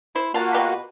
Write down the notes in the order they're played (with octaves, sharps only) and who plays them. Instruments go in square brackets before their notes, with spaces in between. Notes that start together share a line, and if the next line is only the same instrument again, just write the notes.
[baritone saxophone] E4 [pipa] C5
[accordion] A#3 F#4 [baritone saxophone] F4 [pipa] F5 A5
[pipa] B2 G4 B4